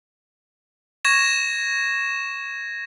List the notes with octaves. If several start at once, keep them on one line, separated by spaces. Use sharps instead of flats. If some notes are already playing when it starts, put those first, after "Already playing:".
C#6 G#6 A#6 E7